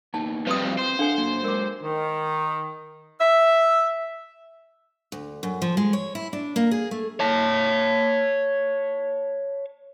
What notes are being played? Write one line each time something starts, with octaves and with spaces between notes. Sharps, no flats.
A#3 B3 D#4 A5
G2 F3 C4 B4 D#6
C5
D4 A4 F5 F#5 G#5
F#3 A#3
F#3 G#3 A#4 D6
D#3
E5
D2
F#2
F3
G#3
C#5
E4
D4
A#3
G#4
A3
C#5 A5